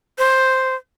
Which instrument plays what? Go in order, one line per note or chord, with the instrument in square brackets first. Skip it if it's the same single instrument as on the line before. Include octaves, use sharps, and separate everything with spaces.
[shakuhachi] C5